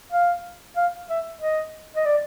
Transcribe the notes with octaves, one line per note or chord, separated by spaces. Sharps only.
F5
F5
E5
D#5
D#5
D5